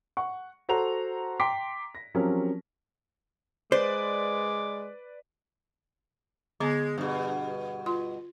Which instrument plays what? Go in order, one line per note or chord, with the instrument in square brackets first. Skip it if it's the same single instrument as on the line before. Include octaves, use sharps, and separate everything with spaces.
[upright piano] F#5 C#6
F#4 A4 C5 F#5 A#5 F7
G5 A#5 C6 D6 B6
A#6
F3 F#3 C4 C#4 G4 A#4
[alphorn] G#3 [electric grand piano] B4 D5 [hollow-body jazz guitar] C5 [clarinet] D6
[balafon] D3 B3 A#5 [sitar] G#3
[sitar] G2 B2
[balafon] F4 C6